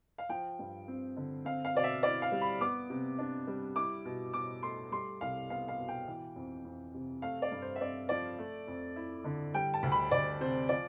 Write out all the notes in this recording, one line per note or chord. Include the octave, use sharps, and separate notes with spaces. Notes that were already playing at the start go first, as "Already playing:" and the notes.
F5
F3 G5
G2
C4
D3
C4 F5
F5
B2 D5
E5
E4 D5
F5
G3
B5
B3 D6
C3
D4
G3
E4 D6
B2
B2 D6
A3 C6
G3 C6
C2 F5
B3 F5
F5
B2
G5
E3
F2
F2
C3
A3 F5
D5
G2
C5
E5
C4 D5
F3 D5
A3
F2
E4
D3
G3 G5
A5
D2
B5
D2 D5
C3 C5
F3 D5